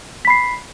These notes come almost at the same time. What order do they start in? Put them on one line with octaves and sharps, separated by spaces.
B6 B5 C7